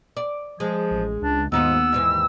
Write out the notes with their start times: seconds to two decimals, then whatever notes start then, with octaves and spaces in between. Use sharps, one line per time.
0.17 D5
0.60 F3 G#3
0.91 A1
1.22 C#2 D4
1.52 D#2 G#2 B3 D#4 F4 E6
1.93 G#2 D#3 E3